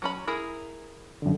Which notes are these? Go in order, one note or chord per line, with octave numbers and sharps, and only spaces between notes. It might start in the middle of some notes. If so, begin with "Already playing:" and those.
F#3 C#4 B5
E4 G#4 A#4
F#2 D3